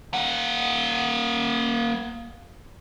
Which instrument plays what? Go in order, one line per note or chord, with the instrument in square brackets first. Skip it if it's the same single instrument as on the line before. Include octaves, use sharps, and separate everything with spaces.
[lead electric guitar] A#3 F#5